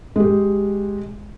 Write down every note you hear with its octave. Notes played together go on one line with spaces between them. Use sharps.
G#3 G4